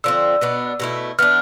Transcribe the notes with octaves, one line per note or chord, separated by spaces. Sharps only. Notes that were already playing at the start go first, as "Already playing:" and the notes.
D3 F3 C4 E6
B2 B3 D4
B2 A3 E4
E3 B3 D4 F6